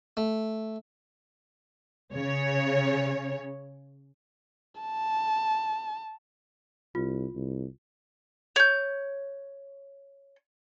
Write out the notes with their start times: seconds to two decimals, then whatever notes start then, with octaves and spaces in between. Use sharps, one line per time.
0.17 A3
2.14 C#3 C#5
4.81 A5
6.95 C2 F4
7.35 C2
8.56 C#5 G6